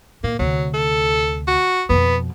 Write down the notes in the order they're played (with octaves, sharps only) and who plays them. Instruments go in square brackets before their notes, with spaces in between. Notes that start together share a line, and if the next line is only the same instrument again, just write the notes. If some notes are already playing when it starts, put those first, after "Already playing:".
[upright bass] A#2 [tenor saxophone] A#3
[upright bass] D2 C3 [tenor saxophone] F#3
[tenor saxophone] A4
F#4
[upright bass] F2 B2 [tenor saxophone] B3